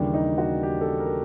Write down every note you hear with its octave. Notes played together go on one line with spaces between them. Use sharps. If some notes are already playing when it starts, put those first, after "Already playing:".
Already playing: D#2 C#3 E3 G3 D4
D#4
F#4
G4
A4
A#4